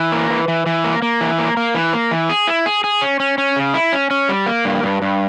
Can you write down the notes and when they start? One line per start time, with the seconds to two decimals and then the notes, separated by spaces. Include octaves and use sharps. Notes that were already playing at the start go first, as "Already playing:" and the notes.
Already playing: E3
0.12 A#3
0.30 E3
0.48 E3
0.66 E3
0.84 A#3
1.02 A#3
1.21 E3
1.38 A#3
1.57 A#3
1.75 E3
1.93 A#3
2.11 E3
2.29 G#4
2.47 E4
2.66 G#4
2.84 G#4
3.02 C#4
3.20 C#4
3.38 C#4
3.56 C#3
3.74 E4
3.93 C#4
4.11 C#4
4.29 G3
4.46 A#3
4.65 G2
4.83 G2
5.02 G2